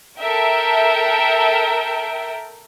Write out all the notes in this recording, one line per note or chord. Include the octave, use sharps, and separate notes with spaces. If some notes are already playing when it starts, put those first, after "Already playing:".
A4 A#4 E5 G5